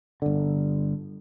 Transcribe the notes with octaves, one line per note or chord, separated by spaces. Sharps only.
G1 D3